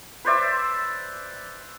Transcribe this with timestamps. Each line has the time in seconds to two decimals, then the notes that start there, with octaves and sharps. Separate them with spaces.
0.25 B4 C5 D5 E5